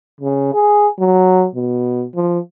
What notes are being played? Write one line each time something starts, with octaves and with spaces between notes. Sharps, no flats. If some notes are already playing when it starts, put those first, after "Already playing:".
C#3
G#4
F#3
B2
F3